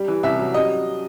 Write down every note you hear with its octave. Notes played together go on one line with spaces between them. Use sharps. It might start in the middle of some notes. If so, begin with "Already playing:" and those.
Already playing: G3
E3
C2 E5
F#3
G3 D#5